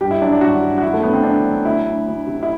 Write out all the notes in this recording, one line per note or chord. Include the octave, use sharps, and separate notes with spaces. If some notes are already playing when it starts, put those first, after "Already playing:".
G2 G4
E4
F#3 D4
D4
G2 F#4
G2
F#4
F#3 E4
A3
F#3 B3
C4
F#3 D4
F#3
D2 E4
D2
D2
C3
E4